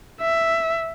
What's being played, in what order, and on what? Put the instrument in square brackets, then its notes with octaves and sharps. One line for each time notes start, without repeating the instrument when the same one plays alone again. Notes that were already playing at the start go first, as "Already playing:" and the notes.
[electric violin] E5